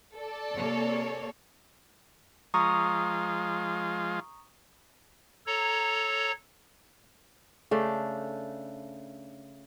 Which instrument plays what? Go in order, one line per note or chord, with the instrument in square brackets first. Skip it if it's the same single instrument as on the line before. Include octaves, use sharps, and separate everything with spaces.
[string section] A4 D5
[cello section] C3 A#3 C#5
[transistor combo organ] F3 G#3 F4 [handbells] A#5 C#6 D#6
[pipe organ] A4 C#5 A#5
[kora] C#3 A3 D4